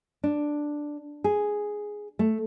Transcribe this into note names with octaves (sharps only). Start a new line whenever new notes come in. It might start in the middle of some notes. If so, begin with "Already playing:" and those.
D4
G#4
A3